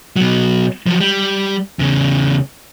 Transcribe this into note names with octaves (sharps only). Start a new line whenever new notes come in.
B2 F#3
F3 F#3
G3
E2 C#3